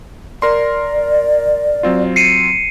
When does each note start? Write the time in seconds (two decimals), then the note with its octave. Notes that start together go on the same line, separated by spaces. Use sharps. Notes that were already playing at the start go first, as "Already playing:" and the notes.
0.42 A#4 D5 C6
1.83 F#3 C4 F4
2.16 C7 C#7 D#7